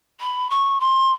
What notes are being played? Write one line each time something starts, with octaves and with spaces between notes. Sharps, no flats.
B5
C#6
C6